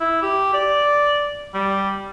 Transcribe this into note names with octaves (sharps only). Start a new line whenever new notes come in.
E4
G4
D5
G3